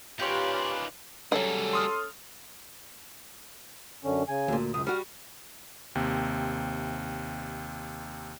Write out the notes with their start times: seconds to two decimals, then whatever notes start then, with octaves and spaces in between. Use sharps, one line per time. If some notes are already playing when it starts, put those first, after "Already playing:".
0.20 A#2 C#4 D#4 F4 G4 B4 C#5 D5
1.32 D#3 F#3 G3 C#4 G#4 A4
1.73 C6 D#6 F6
4.04 F#2 D3 C#4
4.28 C#3 G#5
4.48 D2 A#2
4.74 C#2 F#2 D#6
4.87 G3 F#4 F6
5.95 D#2 C3